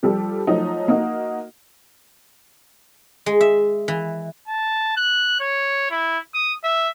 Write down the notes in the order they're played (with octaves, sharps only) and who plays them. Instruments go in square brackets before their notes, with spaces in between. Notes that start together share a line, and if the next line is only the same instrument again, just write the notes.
[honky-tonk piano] F3 G3 G4 A4
F3 F#3 A3 D#4
A#3 D#4 F#4
[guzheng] G#3
E5
E3
[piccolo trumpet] A5
F#6
C#5
E4
D#6
E5